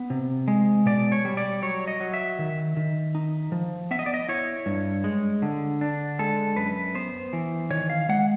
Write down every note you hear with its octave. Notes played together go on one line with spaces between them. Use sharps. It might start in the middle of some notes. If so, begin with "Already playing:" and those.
Already playing: B3
C3
G#3
B2 D5
C#5
G3
D5
F#3 C#5
D#5
F#3
E5
D#3
D#3
D#4
F3
B3 E5
D#5
D5
D#5
E4 C#5
G2
G#3
D3
D4
G#3 A4
F#2 B4
B3 C5
E3
D#3 C#5
F5
G#3 F#5